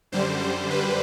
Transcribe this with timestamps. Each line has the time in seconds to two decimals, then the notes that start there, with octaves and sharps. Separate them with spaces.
0.12 F#2 D3 G3 C5
0.42 C5
0.70 B4